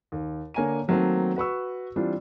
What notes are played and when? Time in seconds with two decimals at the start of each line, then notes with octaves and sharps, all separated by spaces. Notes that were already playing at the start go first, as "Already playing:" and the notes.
0.12 D#2
0.54 D3 A#3 C#5 G#5 A#5 D#7
0.88 D#3 F#3 A3 A#3 C4
1.36 F#4 B4 C#6 E6
1.96 E3 G3 C4 D4 F4